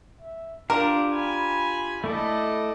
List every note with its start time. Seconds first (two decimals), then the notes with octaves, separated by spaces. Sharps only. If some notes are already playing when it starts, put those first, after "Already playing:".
0.21 E5
0.70 D4 F4 G4 A#4 F5
1.14 G#5 B5
2.04 A3 E4 A4 D5 D#5